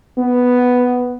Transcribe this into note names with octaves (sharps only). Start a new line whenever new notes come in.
B3